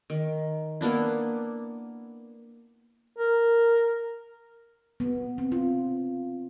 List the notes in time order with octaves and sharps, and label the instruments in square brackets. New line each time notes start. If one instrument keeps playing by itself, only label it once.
[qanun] D#3
A#3 B3 D4 E4
[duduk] A#4
[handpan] B3
C4
F4